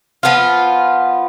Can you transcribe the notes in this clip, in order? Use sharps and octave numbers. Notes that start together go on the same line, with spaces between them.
F3 B3 F4